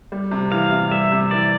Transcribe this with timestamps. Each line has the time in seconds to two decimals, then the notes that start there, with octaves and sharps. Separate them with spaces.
0.12 G3
0.31 C3
0.51 E3 F5
0.71 C3
0.91 G3 E5
1.12 C3
1.31 E3 D5